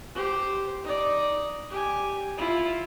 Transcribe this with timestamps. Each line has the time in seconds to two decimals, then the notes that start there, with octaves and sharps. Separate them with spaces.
0.15 G4 C5
0.84 D#4 D5
1.70 G4 G#5
2.38 E4 F4